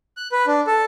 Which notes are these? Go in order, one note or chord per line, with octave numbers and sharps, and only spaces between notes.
F#6
B4
D4
A4